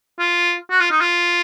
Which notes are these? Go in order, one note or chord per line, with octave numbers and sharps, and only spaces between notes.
F4
F#4
F4
D#4
F4